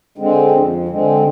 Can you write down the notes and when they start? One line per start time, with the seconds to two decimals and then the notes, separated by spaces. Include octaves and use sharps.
0.18 D3 G#3 C4
0.53 F2
0.88 D3 G#3 C4